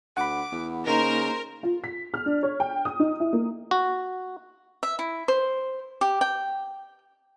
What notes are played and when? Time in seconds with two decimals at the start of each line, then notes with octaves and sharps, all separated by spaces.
0.17 D2 F#5 B5 D6
0.52 E2
0.87 C#3 A#3 D#4 A#4 C5
1.63 F4
1.84 B6
2.14 F6
2.26 D4
2.43 C#5
2.60 G5
2.85 D#6
3.00 D#4
3.20 E4
3.33 A#3
3.71 F#4
4.83 E5
4.99 E4
5.28 C5
6.01 G4
6.21 G5